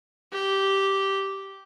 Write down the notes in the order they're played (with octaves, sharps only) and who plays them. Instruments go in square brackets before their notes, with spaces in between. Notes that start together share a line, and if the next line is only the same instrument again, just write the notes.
[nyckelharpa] G4